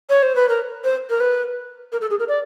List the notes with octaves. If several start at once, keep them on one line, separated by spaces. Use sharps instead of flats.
C#5
C5
B4
A#4
C5
A#4
B4
A#4
A4
G#4
A#4
D5